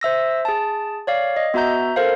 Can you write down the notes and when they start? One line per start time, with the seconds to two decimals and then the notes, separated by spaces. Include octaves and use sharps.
0.01 C5 E5 E6 A#6
0.45 G#4 A5
1.07 C#5 D5 F5
1.36 D#5
1.54 B3 F#4 E5 A#5 G6
1.96 A4 A#4 C5 F5